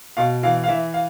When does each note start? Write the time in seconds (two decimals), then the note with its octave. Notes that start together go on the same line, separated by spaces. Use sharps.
0.17 B2 F5
0.43 E3 F5
0.64 F5
0.68 E3 E5
0.94 F5